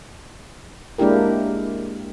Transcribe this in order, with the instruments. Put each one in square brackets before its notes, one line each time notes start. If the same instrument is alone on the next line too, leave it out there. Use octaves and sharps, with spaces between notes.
[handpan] G#3 A#3 D4 E4 G4 A#4